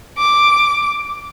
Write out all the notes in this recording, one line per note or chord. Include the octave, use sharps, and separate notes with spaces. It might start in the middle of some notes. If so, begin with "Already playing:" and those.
D6